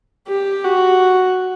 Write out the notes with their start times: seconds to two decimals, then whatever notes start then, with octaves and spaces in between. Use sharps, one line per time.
0.28 G4
0.64 F#4